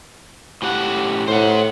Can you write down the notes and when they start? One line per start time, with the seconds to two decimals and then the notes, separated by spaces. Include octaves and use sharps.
0.62 A2 G4 F#5
1.28 A2 C5 F#5